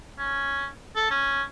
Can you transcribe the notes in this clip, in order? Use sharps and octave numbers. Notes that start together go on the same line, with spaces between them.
C#4
A4
C#4